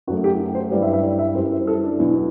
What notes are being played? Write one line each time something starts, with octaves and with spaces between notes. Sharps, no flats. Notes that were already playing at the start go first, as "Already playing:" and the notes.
F#2 F#3 A3 F#4
G4
G4
C5
G2 E3 G3 D5
E5
E5
D5
E5
F#2 E3 G3 C5
C5
A4
D4
E2 B2 F#3